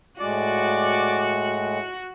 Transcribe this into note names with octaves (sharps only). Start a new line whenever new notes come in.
A2 G#3 F#4 D5